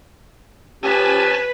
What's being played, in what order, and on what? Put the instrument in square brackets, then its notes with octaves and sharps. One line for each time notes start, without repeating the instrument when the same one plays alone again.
[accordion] F3 C#4 [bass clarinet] G4 [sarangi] B4 [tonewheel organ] G#5 A5